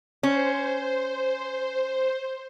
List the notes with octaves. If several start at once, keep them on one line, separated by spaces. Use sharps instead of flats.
C#4 C5